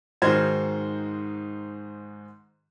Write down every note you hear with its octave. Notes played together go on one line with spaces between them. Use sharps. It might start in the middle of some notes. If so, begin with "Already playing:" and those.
G#2 D#3 F#4 C5 F6 G#6